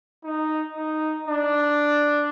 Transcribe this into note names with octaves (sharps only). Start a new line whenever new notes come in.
D#4
D#4
D4